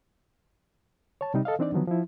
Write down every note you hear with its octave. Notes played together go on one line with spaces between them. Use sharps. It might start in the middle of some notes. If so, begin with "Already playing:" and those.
C#5 A5
C3 G3 D#4
A4 D#5 F5
E3 C4 D4 D#4 D5
D3 D#3 F3 F#3 B3
F3 E4